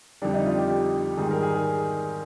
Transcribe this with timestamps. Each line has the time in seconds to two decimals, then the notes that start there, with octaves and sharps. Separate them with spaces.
0.22 F2 D3 G3 D4
0.34 D#4
0.46 F4
0.58 G4
0.70 G4
1.17 G#2 D#3 G3 G#4
1.31 A#4
1.43 G#4
1.54 G#4